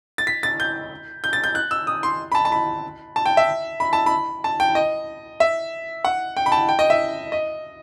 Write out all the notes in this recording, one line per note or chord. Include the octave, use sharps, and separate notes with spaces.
A6
B6
A6
G6
G6
A6
G6
F#6
E6
D#6
C6
B5
A5
A5
B5
A5
G5
E5
B5
A5
B5
A5
G5
D#5
E5
F#5
G5
B5
A5
G5
D#5
E5
D#5